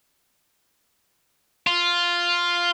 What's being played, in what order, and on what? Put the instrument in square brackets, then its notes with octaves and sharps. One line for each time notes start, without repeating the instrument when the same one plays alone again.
[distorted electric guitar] F4